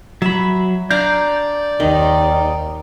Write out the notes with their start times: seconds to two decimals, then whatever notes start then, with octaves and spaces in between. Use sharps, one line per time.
0.22 F#3 E5 B5
0.91 D4 D5 F5 A#5 G6
1.80 D#2 D#3 D#4